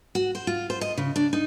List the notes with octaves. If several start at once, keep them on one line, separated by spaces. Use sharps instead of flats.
F#4
C5
F4
C5
D#5
C#3
D4
D#4